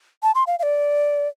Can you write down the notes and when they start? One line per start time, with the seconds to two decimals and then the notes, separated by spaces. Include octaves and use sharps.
0.23 A5
0.35 C6
0.47 F5
0.59 F5
0.63 D5